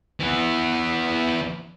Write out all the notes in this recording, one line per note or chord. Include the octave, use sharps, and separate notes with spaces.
E3 B3